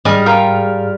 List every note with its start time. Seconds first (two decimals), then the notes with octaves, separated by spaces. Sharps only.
0.05 G#2 G3 G#4 D#5 F6
0.26 F4 A#4 G5